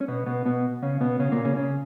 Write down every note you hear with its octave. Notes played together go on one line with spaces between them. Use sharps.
C#4
B2 B3
B2 B3
B2 B3
C#3 C#4
B2 B3
C#3 C#4
A#2 A#3
C#3 C#4
C#3 C#4